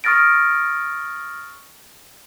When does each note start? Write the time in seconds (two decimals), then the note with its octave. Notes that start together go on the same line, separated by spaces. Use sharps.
0.04 C#6 D#6 F6 A6 A#6 D7